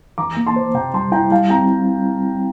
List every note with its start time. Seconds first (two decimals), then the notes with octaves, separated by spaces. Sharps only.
0.18 E3 A#5 D6
0.37 A#3
0.46 A5 C6
0.56 C5
0.74 C3 G5 A#5
0.94 G3 A5 C6
1.12 E4 G5 A#5
1.31 G3 F5 A5
1.50 C4 G5 A#5